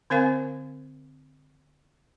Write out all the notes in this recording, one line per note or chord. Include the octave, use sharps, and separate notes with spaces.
D3 C4 A#4 C5 F5 G#5